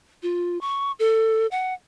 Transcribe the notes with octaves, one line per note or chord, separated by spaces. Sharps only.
F4
C#6
A4
F#5